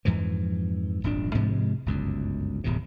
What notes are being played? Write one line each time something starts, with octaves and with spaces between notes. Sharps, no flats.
F2 G#2 E3 F3
D#1 G#1 F2 D4
G#2 C3 F3 G#3
G1 C#2 F#2
D1 E2 A2 C3